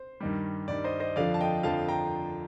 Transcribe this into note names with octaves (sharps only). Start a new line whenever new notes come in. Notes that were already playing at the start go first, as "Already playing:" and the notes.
Already playing: C5
G2 D#3 G3
G2 D#3 G3 D5
C5 D#5
C5 D#5
F2 D3 F3 D5 F5
A5
D#5 G5
F2 D3 F3 F5 A5
G5 A#5